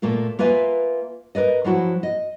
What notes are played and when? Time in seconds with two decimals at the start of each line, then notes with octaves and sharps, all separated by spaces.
0.02 A#2 A3 A#3 F4
0.39 A#3 F4 B4 E5 G#5
1.35 A#4 B4 D5 D#5
1.64 F3 F#3 E4 F#4
2.03 D#5